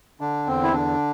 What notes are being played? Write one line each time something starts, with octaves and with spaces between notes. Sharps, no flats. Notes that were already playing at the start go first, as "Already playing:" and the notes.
D3 D4
E2 C4
E4
D3 D4